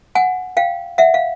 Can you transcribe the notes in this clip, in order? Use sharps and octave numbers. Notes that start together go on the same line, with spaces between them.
F#5 G#5
F5 G5
E5 F#5
F5